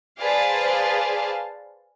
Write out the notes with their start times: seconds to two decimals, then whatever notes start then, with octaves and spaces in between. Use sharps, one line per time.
0.20 G#4 B4 C5 D5 F5 A5